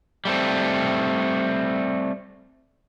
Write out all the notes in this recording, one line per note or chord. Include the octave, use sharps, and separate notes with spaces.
G3 A3 C4